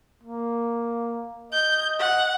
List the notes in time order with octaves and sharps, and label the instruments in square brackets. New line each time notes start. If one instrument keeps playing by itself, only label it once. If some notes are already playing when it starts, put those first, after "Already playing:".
[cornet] A#3
[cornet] D#5 [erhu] G6
[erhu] F#5